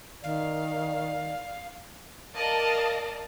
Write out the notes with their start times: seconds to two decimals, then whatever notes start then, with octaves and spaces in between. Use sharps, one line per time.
0.24 D#3 D5 F5
2.35 A#4 D5 D#5 F5 A5